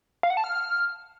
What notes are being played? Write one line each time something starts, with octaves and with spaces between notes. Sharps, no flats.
F5
F#5
A5
F6